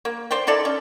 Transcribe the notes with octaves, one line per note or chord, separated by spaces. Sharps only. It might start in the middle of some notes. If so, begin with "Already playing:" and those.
A#3
C5 D5 G5
D#4 E4 A4 D5
C#4